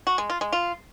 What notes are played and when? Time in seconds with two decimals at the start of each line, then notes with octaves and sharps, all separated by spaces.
0.07 F#4
0.18 G#3
0.30 F4
0.41 G#3
0.52 F4